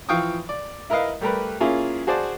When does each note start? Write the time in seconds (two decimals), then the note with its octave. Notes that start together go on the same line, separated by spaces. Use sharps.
0.09 E3 F3 F5 G5 C#6 D#6
0.49 D5
0.90 E4 A#4 B4 D#5 F5
1.21 G3 A3 G4 A#4 B4
1.60 A#3 C#4 E4 F4 G#4
2.07 F#4 G#4 C5 D5 A5